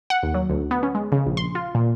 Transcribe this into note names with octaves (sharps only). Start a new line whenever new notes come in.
F#5
D#2
F#3
D2
B3
C#4
G#3
C#3
A#1
C6
F4
A#2